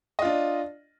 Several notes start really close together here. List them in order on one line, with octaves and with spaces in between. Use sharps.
D#5 F4 D4